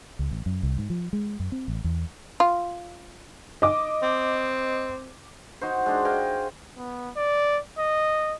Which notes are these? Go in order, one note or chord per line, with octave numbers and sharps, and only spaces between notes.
C#2
A1
F#2
C2
G#2
F3
G#3
F#2
C4
A1
E2
F4
D#5 D6
C4
D#4 F#4 C5
G#3 D4
G#4 D#5 F5 G5
B3
D5
D#5